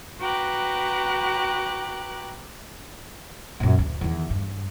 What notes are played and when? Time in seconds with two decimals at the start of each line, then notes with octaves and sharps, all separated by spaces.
0.20 F#4 B4 G5 A#5 D6 F#6
3.60 F#2 A#2
3.79 D2
4.01 E2 D#3
4.30 G2